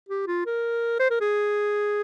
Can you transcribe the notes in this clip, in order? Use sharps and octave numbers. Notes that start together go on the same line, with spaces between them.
G4
F4
A#4
C5
A#4
G#4